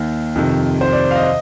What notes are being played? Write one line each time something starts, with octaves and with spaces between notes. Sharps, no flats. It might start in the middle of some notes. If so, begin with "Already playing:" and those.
Already playing: D#2 D#3
F2 C3 D#3
C5
D5
F5
D#5